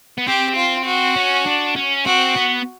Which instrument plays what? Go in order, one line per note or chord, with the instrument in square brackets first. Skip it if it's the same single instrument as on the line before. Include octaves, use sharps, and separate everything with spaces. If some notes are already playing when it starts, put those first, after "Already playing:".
[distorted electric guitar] B3
[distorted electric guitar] C4 [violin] G4
[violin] F4
F#4
[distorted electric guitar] C#4
D4
C#4
[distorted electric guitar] C4 [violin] F#4
[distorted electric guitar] B3